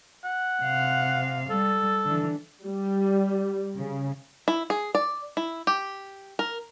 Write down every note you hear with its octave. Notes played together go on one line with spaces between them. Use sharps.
F#5
C3 F5
G3 A4
D3 E3
G3
C#3
E4
G#4
D5
E4
G4
A#4